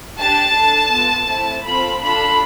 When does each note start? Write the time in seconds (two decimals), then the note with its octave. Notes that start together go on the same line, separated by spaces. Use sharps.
0.18 D4 G4 A5
0.55 D4 A4
0.91 B3 F4 A4
1.28 A3 C4 E4
1.65 C4 F4 A4 B5
2.02 D4 F4 A4 B5